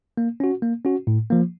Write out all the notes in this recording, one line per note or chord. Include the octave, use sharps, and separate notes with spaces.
A#3
C#4 F#4
A#3
C#4 F#4
A2
F3 A#3